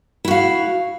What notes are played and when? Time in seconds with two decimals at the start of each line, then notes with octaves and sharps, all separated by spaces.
0.25 E4
0.28 F#4
0.31 F5